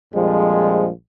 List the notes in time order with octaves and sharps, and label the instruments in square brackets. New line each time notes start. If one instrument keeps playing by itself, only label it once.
[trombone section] A#1 F2 F3 G3 G#3